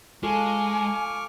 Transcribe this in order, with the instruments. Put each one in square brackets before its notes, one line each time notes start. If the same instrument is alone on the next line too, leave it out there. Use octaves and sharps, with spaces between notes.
[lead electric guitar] G#3 [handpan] F4 A4 [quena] G#5 [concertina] C#6 D6 F6